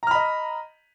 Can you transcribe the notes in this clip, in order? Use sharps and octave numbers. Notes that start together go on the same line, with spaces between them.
D#5 A#5 B5 F6